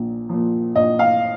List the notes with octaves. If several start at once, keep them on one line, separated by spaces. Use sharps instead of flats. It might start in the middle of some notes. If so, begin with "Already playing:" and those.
Already playing: A#1 A#2
A#2 F3
A#1 D#5
F5